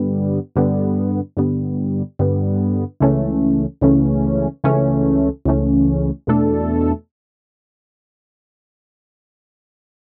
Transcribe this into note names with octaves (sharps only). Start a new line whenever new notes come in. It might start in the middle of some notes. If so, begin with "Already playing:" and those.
Already playing: G2 D3 G3 B3
G2 D3 G3 B3
G2 D3 G3 B3
G2 D3 G3 B3
C#2 C#3 E3 A3 C#4
C#2 C#3 E3 A3 C#4
C#2 C#3 E3 A3 C#4
C#2 C#3 E3 A3 C#4
E2 B2 A3 D4 A4